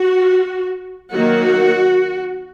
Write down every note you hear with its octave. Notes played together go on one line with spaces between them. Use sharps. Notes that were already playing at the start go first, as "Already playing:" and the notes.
Already playing: F#4
D#3 F#3 A#3 F#4